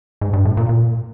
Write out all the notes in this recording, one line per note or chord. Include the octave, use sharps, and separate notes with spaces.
G#2
G2
A2
A#2
A#2